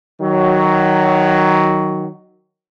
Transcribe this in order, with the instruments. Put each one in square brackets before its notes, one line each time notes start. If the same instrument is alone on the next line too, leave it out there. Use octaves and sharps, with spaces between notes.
[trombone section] D#3 F#3